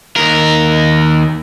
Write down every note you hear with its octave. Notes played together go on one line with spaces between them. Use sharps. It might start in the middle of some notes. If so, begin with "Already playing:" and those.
D#2 A#4